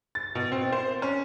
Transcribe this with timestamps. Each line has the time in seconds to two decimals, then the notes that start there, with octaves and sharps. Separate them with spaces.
0.15 A6
0.35 B2
0.52 C4
0.72 C5
1.02 C#4